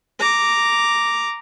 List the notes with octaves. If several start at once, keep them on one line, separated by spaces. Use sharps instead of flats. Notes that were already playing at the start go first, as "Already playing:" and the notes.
A#5 D6